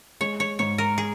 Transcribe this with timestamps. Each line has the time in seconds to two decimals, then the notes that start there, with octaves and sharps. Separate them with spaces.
0.21 G#3 C#5
0.40 C#5
0.59 G#2 C#5
0.78 A#4
0.98 G#4